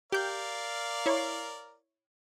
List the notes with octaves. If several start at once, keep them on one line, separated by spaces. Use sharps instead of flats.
G4 A#4 D5 F5 G6
E4 C#5